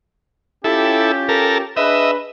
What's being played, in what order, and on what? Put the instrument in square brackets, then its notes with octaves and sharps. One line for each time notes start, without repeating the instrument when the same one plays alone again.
[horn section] C#4 F4 G4 [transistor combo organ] E4 A4
[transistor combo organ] A4 A#4
[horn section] D4 G#4 B4 [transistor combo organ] D#5 E5